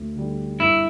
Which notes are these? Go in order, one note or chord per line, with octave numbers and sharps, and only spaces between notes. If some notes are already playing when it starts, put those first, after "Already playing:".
Already playing: D2
D3 G3
G1 E4